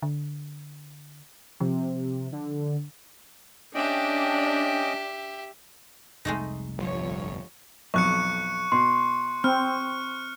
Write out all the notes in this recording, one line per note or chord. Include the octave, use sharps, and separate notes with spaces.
D3
C3 F3
D3
C#4 D4 G4 D#5 E5 G5
F1 C2 G#3 A3 D#4
G1 F3 C#5
B1 F2 C#6 F#6 C#7
B2 C6
C4 F6